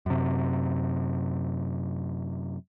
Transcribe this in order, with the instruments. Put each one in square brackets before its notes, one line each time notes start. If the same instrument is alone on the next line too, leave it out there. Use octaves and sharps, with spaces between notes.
[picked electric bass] F#2 C3